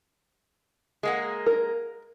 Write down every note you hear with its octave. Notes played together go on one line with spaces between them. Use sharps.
G#3 A#3 F#5
A#4